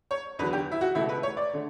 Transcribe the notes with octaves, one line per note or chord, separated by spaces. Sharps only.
C#5
E2 D3 F#3 B4
G4
E4
F#4
C#2 B2 A3 E4
B4
C#5
D5
D3 A3